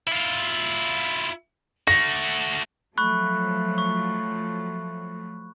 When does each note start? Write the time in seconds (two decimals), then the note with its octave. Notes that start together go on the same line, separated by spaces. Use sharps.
0.07 E4 F4
1.88 A3 F#4 A#6
2.98 F3 F#3 A3 B5 C#6 F#6
3.78 C#6